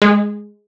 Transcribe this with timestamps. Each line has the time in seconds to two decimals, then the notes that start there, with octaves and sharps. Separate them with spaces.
0.02 G#3